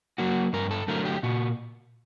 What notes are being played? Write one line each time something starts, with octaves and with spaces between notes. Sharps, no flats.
F#3 A#3 F#4
G2 A#4
A4
D3 F#3 A3 A#4
G4
A#2 F#4